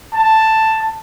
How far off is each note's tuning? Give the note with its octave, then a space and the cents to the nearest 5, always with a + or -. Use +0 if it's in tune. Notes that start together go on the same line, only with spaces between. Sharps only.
A5 +5